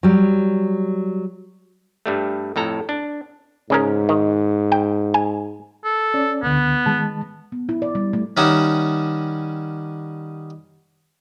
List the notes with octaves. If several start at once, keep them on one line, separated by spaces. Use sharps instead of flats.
F#3 G3
G2 G3 A3
F2 A2 A4 A#5
D4
G#2 C#3 C#4 A#4
D#3
G5
G#5
A4
C#4 D5
C#2 D3 B3
D#3 G#3 A5
B3
E4
D5
G3
A3
D#3 G3 C#4 D#4 E5 F#5